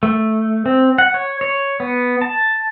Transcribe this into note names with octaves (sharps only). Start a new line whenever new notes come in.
A3
C4
F#5
C#5
C#5
B3
A5